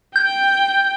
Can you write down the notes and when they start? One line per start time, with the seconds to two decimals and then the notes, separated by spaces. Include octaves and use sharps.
0.16 G5 G6